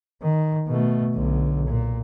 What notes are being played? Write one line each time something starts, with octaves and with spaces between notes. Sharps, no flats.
D#3
B2 A3
B1 D3
A#2